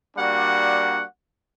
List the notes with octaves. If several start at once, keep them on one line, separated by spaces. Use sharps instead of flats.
G3 A#3 D4 F#4 D5 F#5